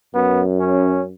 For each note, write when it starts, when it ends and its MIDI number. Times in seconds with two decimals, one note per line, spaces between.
0.15 1.14 42
0.15 0.42 59
0.60 1.04 61